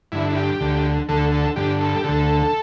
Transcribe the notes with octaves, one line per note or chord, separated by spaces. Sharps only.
G2 D3 E4
E4
G4
D2 D3
D2 D3 A4
A4
G2 D3 G4
A4
G4
D2 D3 A4